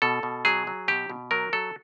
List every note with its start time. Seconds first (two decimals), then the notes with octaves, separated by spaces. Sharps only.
0.02 B2 A4
0.23 B2
0.45 F#3 G#4
0.67 F#3
0.88 B2 G4
1.10 B2
1.31 F#3 A#4
1.53 F#3 A4